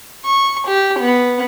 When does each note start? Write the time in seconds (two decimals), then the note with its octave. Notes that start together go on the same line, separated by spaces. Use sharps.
0.25 C#6
0.68 G4
0.99 B3